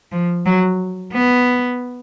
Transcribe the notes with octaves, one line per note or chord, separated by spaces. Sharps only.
F3
F#3
B3